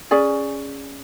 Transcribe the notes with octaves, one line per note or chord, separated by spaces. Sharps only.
C#4 G#4 D5 G#5